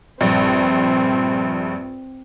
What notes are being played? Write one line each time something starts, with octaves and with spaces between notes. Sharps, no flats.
A#1 G2 C4